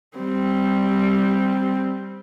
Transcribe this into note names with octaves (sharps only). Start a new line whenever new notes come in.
G3 C4